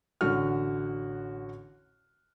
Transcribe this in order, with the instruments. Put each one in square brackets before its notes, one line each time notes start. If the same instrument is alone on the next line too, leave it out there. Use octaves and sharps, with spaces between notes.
[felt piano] A1 D3 F#4 F6